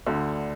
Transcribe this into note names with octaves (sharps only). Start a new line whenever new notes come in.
D2 D3